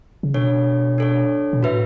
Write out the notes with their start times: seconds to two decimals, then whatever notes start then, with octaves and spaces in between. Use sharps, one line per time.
0.23 C#3
0.34 B2 D4 A4 C#5
0.98 D4 A4 C#5
1.53 B2
1.63 A2 F#4 B4 E5